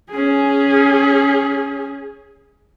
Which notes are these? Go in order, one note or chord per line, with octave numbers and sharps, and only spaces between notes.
C#4 G#4